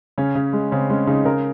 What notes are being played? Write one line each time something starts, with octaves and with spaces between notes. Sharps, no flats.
C#3 C#4
C#3
G#3
C#3 C4
G#3 C#4
C#3 D#4
C#3 A#4